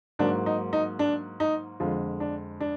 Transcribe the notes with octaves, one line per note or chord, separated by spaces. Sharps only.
G#2 F#3 A#3 D4
D#4
D#4
D4
D#4
F2 D3 G#3 F4
D4
D4